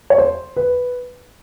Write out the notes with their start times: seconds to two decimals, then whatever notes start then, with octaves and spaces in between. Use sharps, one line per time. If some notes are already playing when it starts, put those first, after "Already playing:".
0.10 C#5
0.18 C5
0.56 B4